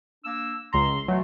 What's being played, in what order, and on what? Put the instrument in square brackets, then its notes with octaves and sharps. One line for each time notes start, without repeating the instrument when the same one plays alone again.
[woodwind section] A#3 D4 E6
[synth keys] C#2 A#5 [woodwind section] C6
[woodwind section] B2 E3 A3 [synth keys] F#3